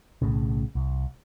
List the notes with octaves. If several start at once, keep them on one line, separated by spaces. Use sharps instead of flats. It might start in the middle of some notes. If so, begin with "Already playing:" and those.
B1 A2 C#3
C2